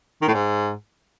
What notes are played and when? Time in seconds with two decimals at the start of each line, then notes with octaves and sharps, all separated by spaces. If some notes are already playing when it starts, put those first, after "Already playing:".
0.22 D#3
0.28 A2
0.34 G#2